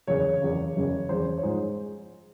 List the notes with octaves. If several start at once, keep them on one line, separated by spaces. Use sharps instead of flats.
F#1 E2 C#3 C#5
F#1 E2 C#3
F#1 E2 C#3
F#1 E2 C#3 C5
C#5
G#2 F3 G#3 C5